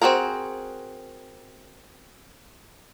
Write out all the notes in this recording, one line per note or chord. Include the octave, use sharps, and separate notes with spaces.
C4 D4 F#4 G#4 A#4